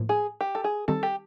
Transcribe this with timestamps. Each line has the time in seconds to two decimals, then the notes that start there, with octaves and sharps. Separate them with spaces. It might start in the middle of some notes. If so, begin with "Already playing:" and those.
Already playing: A2 F3 A#3
0.09 G#4
0.41 G4
0.55 A4
0.64 G#4
0.88 D#3 G3 C4 A4
1.03 G4